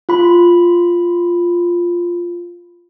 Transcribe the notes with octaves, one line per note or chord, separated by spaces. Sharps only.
F4 B5